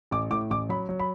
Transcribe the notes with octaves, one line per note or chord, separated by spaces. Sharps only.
A1 D6
A2 D6
A1 D6
F#3 B5
F#3
B5